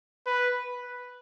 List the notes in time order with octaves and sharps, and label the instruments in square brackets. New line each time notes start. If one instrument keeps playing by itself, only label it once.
[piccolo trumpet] B4